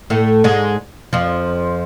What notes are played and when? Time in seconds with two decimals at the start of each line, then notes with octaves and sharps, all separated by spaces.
0.10 A2 A3
0.44 G#2 G#3
1.13 F2 F3